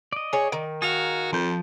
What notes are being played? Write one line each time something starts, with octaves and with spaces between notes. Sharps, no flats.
D5 D#5
G#4 C#5
D#3
F#4 G#4 F5
F2 F3 G6